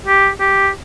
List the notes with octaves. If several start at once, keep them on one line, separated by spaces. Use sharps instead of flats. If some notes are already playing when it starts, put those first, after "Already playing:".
G4
G4